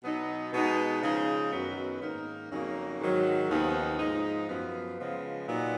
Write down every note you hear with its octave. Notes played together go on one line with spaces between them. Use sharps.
B2 F#3 B3 D#4
B2 G#3 B3 D#4
C#3 F3 G#3 D#4
F#2 D#3 F#3 B3
G#2 D#3 A#3 D#4
F2 C#3 F#3 A#3 D#4
G#2 D#3 F#3
D#2 C#3 F3 B3 D#4
G#2 F3 G#3 D#4
F#2 F3 B3
C#3 F3 G#3 B3
A#2 F#3 B3 D#4